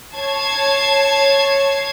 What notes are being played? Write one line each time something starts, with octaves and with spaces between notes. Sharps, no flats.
C#5 A5 G#6 C7